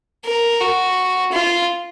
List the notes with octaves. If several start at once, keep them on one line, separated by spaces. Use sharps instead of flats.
A#4
F#4
F4